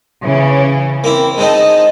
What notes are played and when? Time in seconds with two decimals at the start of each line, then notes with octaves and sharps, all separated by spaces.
0.24 C#3 E3 C#4
1.04 A#3 C4 E4
1.38 G#3 C4 D#4 D#5 A5